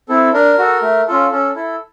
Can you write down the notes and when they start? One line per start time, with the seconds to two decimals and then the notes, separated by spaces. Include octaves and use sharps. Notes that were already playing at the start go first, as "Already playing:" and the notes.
0.09 C4 E4 A4
0.33 D4 A#4
0.58 F#4 A4
0.82 A3
1.08 C#4 F4 A4
1.31 C#4 A4
1.56 E4 A4